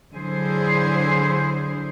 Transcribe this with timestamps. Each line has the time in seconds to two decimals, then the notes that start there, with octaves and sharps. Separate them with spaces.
0.13 D3 F#3 E4 G#4 C5